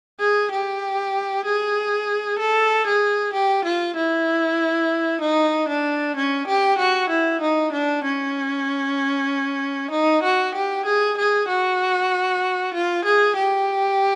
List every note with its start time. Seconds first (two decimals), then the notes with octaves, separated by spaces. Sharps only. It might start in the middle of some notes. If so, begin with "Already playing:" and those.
0.19 G#4
0.51 G4
1.45 G#4
2.39 A4
2.86 G#4
3.33 G4
3.65 F4
3.96 E4
5.21 D#4
5.69 D4
6.16 C#4
6.47 G4
6.78 F#4
7.09 E4
7.41 D#4
7.72 D4
8.03 C#4
9.91 D#4
10.23 F#4
10.54 G4
10.85 G#4
11.17 G#4
11.48 F#4
12.74 F4
13.05 G#4
13.36 G4